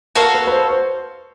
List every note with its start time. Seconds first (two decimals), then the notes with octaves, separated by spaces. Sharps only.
0.15 F#4 A4 A#4 C#5 F5
0.34 B4
0.47 B4
0.52 C5
0.70 C5